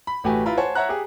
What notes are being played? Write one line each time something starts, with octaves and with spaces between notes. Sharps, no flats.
B5
A1 A3 F#4 G4 B4 G#5
E4 F4 B4 A#5 B5
C5 C#5 F#5 G#5 A5
C#5 E5 F#5 A#5 F#6
G4 G#4